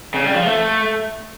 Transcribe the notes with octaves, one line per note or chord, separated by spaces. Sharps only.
C#3
G3
F3
A3